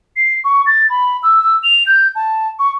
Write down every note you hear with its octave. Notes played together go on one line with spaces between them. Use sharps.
C7
C#6
A6
B5
E6
E6
F7
G6
A5
C#6